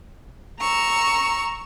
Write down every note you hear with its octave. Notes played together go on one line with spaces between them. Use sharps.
A#5 C#6 E6